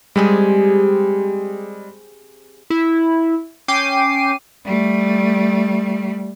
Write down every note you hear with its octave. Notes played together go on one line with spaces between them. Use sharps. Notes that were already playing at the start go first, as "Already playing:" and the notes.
G3 G#3 C4 G4 G#4
E4
C#4 G5 D6 C7 D#7
G3 A3